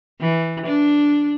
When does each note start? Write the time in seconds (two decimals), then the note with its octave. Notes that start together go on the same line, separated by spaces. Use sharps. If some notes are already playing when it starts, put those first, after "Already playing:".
0.21 E3
0.66 D4